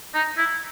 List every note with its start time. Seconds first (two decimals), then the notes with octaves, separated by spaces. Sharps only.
0.14 D#4
0.37 E4